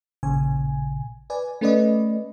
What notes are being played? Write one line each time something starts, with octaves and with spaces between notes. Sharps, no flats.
A1 A#2 C#3 G#5
B4 D5 G#5
A3 C#4 A4 B4 D5 D#5